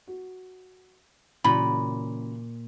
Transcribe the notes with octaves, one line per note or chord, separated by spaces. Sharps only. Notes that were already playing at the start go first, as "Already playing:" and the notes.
F#4
A#2 C#3 E3 F#3 B5